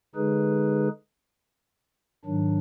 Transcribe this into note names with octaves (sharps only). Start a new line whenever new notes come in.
D3 G#3 D#4 G#4 B4
G#2 D#3 F#3 D4